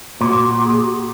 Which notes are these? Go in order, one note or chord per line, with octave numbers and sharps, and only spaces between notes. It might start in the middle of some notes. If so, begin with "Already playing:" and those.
A#2 F#4
G#4
G4
F#4
G4